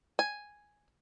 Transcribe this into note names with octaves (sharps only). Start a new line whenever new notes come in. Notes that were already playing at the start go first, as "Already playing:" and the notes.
G#5